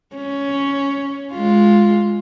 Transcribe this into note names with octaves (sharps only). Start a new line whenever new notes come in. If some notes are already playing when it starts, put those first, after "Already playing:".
C#4
G#3 F4